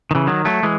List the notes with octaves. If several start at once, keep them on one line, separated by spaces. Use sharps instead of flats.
D#3
C#3 E3
D#3 F#3
F#3 A3
E3 G#3